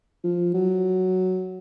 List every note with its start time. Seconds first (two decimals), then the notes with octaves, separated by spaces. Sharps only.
0.24 F3
0.54 F#3